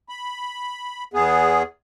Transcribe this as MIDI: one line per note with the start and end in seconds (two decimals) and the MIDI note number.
0.09 1.04 83
1.13 1.63 40
1.13 1.63 59
1.13 1.63 68